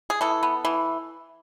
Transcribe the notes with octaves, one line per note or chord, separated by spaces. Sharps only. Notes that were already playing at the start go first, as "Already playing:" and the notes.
G#4
E3 A4
B3
E3